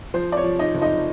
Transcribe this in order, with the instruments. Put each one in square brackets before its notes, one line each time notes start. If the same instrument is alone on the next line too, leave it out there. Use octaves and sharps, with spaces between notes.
[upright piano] F3 C5
D5
C#5
F3
D#4 D#5
F#1
D#4 D#5